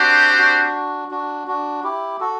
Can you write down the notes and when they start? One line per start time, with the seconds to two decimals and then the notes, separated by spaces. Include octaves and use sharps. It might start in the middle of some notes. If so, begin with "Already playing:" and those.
Already playing: C4 D4 F#4 G4 C5 F#5
0.38 D4 F#4
1.11 D4 F#4
1.47 D4 F#4
1.84 E4 G4
2.20 F#4 A4